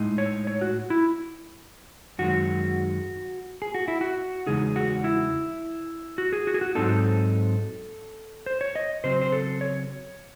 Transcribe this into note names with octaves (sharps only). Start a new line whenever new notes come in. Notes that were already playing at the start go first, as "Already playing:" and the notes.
Already playing: A2 G#3 D#4
C#5
C#5
F#4
E4
F#2 D#3 G#3 F#4
G#4
F#4
E4
F#4
E2 C#3 G#3 D#4 G#4
F#4
E4
F#4
G#4
F#4
G#4
F#4
G#2 F#3 C4 D#4 A4
C5
C#5
D#5
C#3 F#3 C4 C5
C5
A4
C#5